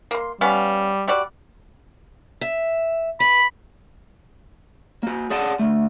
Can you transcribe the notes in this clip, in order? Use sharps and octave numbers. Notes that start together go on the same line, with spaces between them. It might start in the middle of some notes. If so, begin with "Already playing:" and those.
A#3 C6
G3 B3 C#4 F5
G3 F#4 D5
E5
B4 B5
A#3 F#4
G#4 D5 F#5 A5
D2 A3